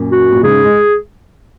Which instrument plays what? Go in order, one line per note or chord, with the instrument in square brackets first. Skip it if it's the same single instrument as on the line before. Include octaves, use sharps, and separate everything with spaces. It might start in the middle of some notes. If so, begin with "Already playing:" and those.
Already playing: [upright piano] F#2 A#2
[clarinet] F#4
[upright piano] A#2
[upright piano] G#2 C#3 [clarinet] G#4
[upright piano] G#3